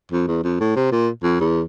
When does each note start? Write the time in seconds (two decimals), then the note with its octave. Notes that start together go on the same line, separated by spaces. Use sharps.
0.12 F2
0.28 E2
0.44 F2
0.61 A2
0.76 C3
0.92 A#2
1.23 F2
1.40 E2